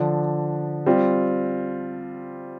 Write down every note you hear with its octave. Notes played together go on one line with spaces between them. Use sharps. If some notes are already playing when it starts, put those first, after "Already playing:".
Already playing: D3 F3 D4
G3 C4 F4